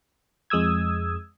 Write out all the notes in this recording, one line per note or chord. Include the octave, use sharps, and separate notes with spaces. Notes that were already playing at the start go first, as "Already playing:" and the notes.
F2 G#3 D#6 E6 G#6